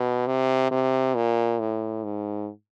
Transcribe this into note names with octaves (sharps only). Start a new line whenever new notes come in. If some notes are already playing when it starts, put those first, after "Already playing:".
Already playing: B2
C3
C3
A#2
A2
G#2